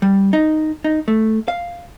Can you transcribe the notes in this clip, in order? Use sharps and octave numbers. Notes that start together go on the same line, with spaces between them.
G3
D#4
D#4
A3
F5